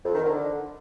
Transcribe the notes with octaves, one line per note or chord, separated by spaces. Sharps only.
F2
D#3
D3